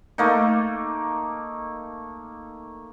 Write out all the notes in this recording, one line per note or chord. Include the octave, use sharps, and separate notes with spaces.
A3 A#3 D#4